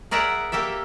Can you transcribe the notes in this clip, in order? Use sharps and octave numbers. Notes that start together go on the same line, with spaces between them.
G#4 A#4 D5 E5 F#5 A#5
A#3 G4 A4 E5